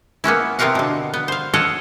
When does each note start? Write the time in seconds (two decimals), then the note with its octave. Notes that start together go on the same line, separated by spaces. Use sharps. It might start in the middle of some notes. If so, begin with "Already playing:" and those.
0.24 A#3 B3 C#4 E4
0.59 C3 B3 C4 A#4 F5 F#5
0.75 B2 D3
1.13 B3
1.28 C5 F5
1.54 A4 C#5 D#5 F5 F#5